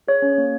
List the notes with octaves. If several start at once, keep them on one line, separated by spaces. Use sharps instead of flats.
G#4 C#5
C#4
A#3